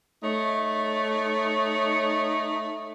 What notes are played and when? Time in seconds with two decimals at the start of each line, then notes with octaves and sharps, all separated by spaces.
0.23 A3 D#4 C#5